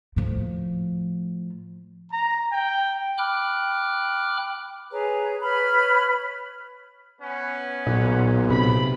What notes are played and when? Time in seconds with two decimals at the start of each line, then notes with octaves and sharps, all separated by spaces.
0.16 A2 F3
2.12 A#5
2.52 G5
3.18 G5 B5 D6 F6 F#6
4.91 G#4 B4 C#5 A#5
5.42 B4 C#5 B5 F6
7.21 B3 C#4 B4
7.87 B1 A#2
8.50 C3 B5